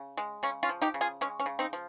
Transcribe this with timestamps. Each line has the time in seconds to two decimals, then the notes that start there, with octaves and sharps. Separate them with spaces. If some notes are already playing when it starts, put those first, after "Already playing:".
Already playing: C#3
0.17 G#3
0.43 C#3 C#4
0.63 C#4 F4
0.69 F3
0.82 D#4 G4
0.94 C#3
1.01 F4 G#4
1.21 G#3 C#4
1.40 C#4
1.46 C#3
1.59 C4 D#4
1.73 F3